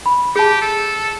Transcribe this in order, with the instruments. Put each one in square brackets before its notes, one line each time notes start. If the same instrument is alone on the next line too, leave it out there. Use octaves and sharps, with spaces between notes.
[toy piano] B5
[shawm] G4 [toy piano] G#4 A5
[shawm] A4